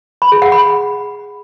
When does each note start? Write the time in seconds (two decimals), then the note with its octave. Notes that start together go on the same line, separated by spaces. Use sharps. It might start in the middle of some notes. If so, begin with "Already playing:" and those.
0.22 B5
0.32 G#4
0.42 F#5
0.52 B5